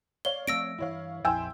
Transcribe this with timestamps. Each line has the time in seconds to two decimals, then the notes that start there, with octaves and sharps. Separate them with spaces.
0.25 C#5 D5 F5 G7
0.47 F3 A3 C4 E6 A#6 D7
0.78 G2 E3 E4 C#5 F5
1.25 A#1 F2 F3 E4 G5 G#5 C6 E6